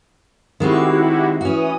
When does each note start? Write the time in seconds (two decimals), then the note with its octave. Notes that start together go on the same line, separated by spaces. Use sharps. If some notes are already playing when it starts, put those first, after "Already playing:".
0.60 D#3 G#3 C4 E4 F#4 G4
1.41 E3 C#4 F#4 D#6